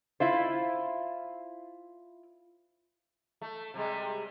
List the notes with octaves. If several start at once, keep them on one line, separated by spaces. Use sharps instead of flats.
E4 F4 C5
A3
C3 G3 G#3